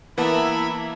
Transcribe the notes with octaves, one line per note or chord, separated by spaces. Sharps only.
E3 A#3 B3 E4 A#4 E5 A5 B5